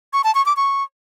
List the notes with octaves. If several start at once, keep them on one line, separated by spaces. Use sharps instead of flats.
C#6
A5
C#6
D6
C#6